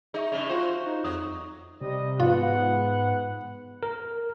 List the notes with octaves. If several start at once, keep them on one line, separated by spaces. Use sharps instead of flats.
D#4 G#4 E5 C#6
G2 C#3
F4 F#4 C5
D#4
F2 F#3 D#6
C3 G3 D#5
G#2 B3 F4 F#5
A#4